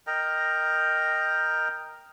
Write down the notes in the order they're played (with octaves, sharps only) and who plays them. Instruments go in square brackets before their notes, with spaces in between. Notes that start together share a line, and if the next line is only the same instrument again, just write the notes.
[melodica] A#4 D#5 G5 A#5